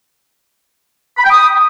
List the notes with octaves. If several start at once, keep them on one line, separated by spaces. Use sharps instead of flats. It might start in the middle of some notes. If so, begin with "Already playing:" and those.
B5
G5
D#6